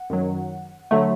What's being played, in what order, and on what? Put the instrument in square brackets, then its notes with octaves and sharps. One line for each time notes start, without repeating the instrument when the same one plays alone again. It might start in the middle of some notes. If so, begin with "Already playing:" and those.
Already playing: [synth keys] F#5
F#2 D#3 F#3
D3 F#3 A3